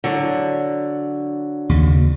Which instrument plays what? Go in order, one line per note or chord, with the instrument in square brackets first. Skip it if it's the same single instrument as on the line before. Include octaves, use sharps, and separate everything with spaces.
[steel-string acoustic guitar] D3 F#3
[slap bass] D#2 C#3